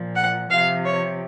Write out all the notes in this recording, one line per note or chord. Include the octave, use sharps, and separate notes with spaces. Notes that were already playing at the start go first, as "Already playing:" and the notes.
Already playing: A#2 F3
F#5
C3 F3 F5
C#5